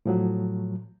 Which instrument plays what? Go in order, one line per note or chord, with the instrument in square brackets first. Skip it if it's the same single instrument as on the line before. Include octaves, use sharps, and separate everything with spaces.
[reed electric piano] A2 F3 F#3